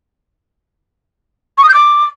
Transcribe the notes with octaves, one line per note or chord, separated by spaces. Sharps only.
C#6
D#6
G6
D6